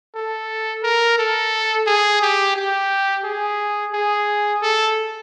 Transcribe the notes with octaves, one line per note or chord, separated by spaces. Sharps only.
A4
A#4
A4
G#4
G4
G4
G#4
G#4
A4